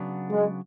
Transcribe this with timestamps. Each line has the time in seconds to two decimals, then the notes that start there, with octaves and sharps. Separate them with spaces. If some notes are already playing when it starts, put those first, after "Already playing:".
Already playing: C#3 F#3 B3 D4
0.30 G#3